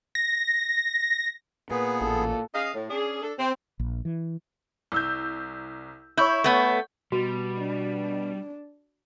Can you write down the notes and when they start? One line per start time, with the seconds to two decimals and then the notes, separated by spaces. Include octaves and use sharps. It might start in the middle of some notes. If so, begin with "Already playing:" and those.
0.15 A#6
1.71 A#2 B3 G#4 B4
2.01 A1 A4
2.54 C#4 G#4 D#5 F5
2.74 A2
2.89 C#4 D4 G#4
3.22 D4 A4
3.38 C4
3.79 A#1
4.05 E3
4.92 C2 E6 G6
6.17 E4 C#5 C#6 G6
6.44 A3 B3
7.12 B2 G3 F#4
7.58 D4